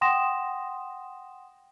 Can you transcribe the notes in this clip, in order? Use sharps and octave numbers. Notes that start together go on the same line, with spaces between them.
F#5 G5 C6 D#6 A#6 E7